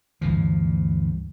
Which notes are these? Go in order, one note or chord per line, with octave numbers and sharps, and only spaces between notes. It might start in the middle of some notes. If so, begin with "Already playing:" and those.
D2 G2 E3 F3